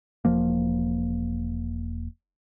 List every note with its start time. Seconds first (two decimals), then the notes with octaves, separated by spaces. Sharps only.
0.25 E1 F3 A#3